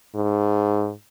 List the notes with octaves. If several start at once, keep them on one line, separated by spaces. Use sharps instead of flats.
G#2